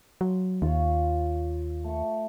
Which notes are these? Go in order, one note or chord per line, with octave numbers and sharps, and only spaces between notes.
F#3 C6
D#2 F4 C#5
A3 C#6